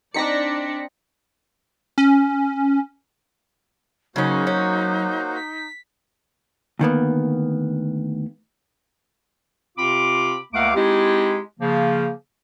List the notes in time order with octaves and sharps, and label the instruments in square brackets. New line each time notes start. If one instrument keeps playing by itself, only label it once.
[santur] C4 D#4 C5 [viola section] D4 D5 [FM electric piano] A#6 B6 C#7
[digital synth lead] C#4
[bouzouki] C#3 C#4 [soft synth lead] F#3 [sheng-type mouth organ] A#3 F#4 C5 [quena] D#4
[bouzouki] C#4
[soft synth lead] B6
[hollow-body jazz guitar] D2 D#3 A#3 B3
[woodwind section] C3 C4 F4 B5 D6
C#2 A3 A#3 F5 F#5 D6
G#3 C4 D#4 E4 G4
C#3 F3 A#3